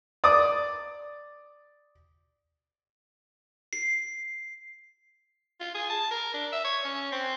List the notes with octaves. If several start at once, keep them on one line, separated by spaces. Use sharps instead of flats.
D5 D6 D#6
C7
F4
G#4
A5
A#4
D4
E5
C#5
C#4
C4